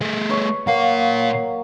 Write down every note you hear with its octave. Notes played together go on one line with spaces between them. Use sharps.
A3 G#4
B4 C#5 C#6
A#2 F#3 A#3 F5